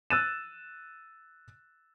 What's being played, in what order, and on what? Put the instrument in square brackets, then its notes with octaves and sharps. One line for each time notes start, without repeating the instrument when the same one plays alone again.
[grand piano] E6 F#6 A6 D#7 E7